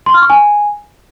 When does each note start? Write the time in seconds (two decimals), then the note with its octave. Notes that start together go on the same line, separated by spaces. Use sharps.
0.06 C6
0.14 F6
0.22 C#6
0.30 G#5